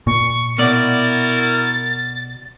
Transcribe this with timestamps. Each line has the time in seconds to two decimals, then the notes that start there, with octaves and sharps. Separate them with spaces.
0.07 A#2 C#6
0.58 B2 E4 F#4 A#4 D5 A6